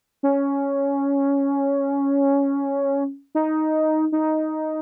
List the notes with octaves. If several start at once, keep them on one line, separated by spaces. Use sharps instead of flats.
C#4
D#4
D#4